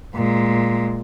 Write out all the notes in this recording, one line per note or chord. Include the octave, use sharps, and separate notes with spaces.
A#2 G#3